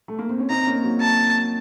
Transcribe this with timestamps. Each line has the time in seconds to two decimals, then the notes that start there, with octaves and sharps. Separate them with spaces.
0.08 A3
0.19 A#3
0.29 C4
0.39 C#4
0.50 C4 D#4 A#5
0.67 A#3 C#4
0.84 F#3 A#3
1.01 A5